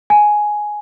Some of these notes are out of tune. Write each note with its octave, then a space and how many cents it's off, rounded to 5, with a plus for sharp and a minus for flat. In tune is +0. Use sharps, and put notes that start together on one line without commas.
G#5 +5